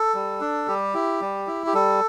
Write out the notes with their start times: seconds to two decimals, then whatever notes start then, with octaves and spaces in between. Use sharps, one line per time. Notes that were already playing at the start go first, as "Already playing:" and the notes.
Already playing: A4
0.15 G3
0.41 D4
0.68 G3 G4
0.94 E4
1.21 G3
1.47 E4
1.67 G4
1.74 G3 A4